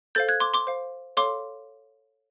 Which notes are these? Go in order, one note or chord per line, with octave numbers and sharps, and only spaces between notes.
A4 C5 F5 G6 A6
F#6 G#6
C6 D6
C6 D6
C5 F5
A4 C#5 F5 C6 D6